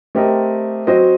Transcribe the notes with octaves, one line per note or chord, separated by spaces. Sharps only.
A3 C4 G4 A#4 D#5
F#3 C4 F#4 C5 D#5